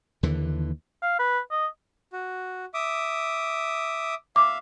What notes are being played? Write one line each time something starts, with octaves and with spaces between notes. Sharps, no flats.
D#2 D3 E3
F5
B4
D#5
F#4
E5 D6 D#6
E5 F5 D6